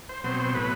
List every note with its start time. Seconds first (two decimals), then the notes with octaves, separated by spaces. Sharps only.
0.09 C5
0.24 B2 F#3 C4 C5
0.40 C5
0.55 A2 F#3 B3 B4